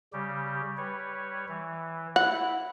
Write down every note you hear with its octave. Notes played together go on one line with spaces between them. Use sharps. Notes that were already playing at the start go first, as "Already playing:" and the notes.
C#3 G3 G4
G3 B4 C#5
E3
E4 F#5